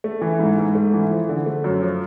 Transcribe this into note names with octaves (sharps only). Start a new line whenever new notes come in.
A3
E3
G#2
G#2
A3
E3
F3
D3
A3
F#2
F3